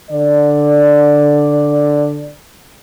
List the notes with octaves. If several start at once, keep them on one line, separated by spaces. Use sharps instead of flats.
D3 D5